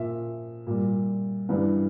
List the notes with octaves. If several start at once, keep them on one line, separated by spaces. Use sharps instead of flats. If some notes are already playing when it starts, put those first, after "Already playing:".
Already playing: A#2 F3 E5
A#2 G3
G2 E3 G3